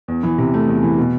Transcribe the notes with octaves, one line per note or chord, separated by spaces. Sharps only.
E2
E3
C3
A3
E2
E3
B2